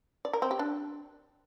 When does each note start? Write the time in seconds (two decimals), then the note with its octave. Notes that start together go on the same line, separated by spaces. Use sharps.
0.25 D5
0.33 A#4
0.42 C4
0.51 G4
0.59 D4